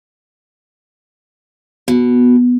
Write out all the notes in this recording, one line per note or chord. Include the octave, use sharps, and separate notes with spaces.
B2